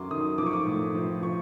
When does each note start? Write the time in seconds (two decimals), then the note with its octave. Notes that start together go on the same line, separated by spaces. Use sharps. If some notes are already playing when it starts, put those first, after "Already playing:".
Already playing: F#2 D#3 F#3 C6 D6
0.11 D#3 D#6
0.38 F3 D6
0.46 C#6
0.53 D6
0.66 A2
0.95 F3
1.23 F3 C#6